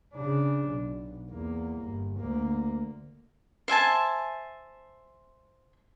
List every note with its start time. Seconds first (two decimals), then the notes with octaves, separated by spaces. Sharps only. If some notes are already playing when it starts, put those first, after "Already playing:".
0.14 C#3 D4
0.69 B1
1.31 E2 A#3
1.82 G1
2.19 D2 A#3
3.68 C5 E5 G#5 A5